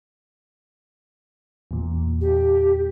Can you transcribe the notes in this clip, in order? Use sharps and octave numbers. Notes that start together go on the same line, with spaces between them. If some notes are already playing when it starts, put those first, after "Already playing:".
E2 A#2
G4